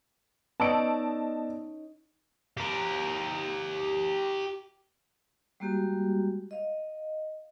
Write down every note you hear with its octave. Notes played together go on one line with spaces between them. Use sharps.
B3 C#4 D#4 D5 D#5 A5 E6 D7
G4 A#4
G3 G#3 A#3 F#4 G4
D#5 F5